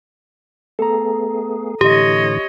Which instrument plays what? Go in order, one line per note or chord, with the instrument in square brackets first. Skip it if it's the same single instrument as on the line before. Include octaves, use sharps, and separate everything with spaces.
[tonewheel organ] A3 B3 G#4 [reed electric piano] A4 A#5
[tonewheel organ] A2 D3 E3 [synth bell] G4 [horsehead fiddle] C#5 D#5